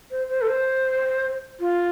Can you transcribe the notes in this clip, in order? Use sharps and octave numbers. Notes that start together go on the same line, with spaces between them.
C5
C5
A4
C5
F4